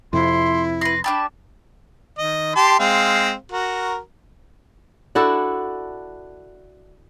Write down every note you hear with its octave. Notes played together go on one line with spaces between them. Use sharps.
F2 C3 E4 C6
B4 C6 A#6
D4 G4 A5 B5
D#3 D#5
G4 A5 C6
G#3 C4 F5
F#4 A#4
D4 E4 F#4 A4